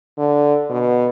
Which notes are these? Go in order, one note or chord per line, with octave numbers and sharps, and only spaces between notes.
D3
B2